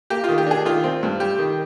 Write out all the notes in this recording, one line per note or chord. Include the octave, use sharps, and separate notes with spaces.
A#3 G4
F4
D#3
G4
D4 G#4
D#3 F4
C4
G2
G3 G4
D#3